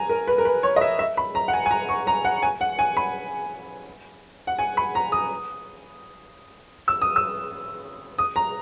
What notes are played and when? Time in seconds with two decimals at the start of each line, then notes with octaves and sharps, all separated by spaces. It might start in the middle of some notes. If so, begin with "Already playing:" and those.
Already playing: G#5 A#5
0.10 A#4
0.27 B4
0.38 A#4
0.45 B4
0.63 C#5
0.76 D#5
0.81 E5
0.99 E5
1.17 B5
1.35 A#5
1.48 F#5
1.53 G#5
1.66 G#5
1.71 A#5
1.89 C#6
2.07 A#5
2.25 F#5
2.42 G#5
2.61 F#5
2.79 G#5
2.97 B5
4.47 F#5
4.59 G#5
4.77 B5
4.95 A#5
5.12 D#6
6.88 E6
7.02 D#6
7.16 E6
8.19 D#6
8.36 A#5